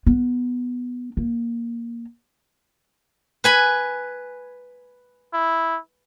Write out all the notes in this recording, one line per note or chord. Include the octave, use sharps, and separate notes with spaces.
B3
A#3
B4 G#5 B5
E4